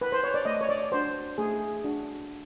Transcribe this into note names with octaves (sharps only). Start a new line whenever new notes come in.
B4
C5
C#5
D5
A3 D#5
C#5
D5
D4 F#4 C5
A3 G#4
D4 F#4